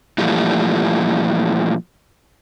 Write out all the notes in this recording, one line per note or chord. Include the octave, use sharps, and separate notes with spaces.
A#2 E3 F3 G3 A3